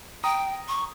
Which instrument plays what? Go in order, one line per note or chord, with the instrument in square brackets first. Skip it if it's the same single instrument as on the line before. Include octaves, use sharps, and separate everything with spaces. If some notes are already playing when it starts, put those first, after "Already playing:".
[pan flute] G5 [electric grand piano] A#5 D#6
[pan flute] C#6